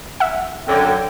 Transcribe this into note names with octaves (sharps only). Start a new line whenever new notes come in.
E5 F#5
F#2 D3 G5